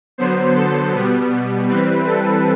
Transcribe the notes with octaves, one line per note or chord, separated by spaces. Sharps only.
D3 F#3 B3 C5
A4
B2 G3 B3
E3 G3 C4 B4
A4